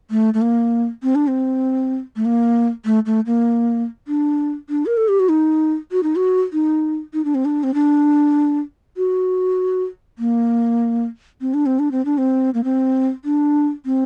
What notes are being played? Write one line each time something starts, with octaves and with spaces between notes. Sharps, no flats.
A3
A3
A#3
C4
D4
C4
A3
A#3
A3
A3
A#3
D4
D4
A#4
A4
G4
F#4
D#4
F#4
D#4
F#4
D#4
D#4
D4
C4
D4
C4
D4
F#4
A#3
C4
D4
C4
D4
C4
D4
C4
A#3
C4
D4
C4